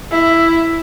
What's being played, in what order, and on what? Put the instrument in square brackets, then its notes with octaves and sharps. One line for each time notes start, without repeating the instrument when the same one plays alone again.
[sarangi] E4